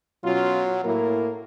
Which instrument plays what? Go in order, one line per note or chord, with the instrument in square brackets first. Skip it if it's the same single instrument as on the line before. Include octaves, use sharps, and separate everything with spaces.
[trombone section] B2 C#4 F4 [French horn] F#3
[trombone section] A2 A#3 E4 [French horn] A#4